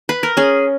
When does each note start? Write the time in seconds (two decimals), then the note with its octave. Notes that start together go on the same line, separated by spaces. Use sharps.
0.09 B4
0.23 A#4
0.37 C#4 G#4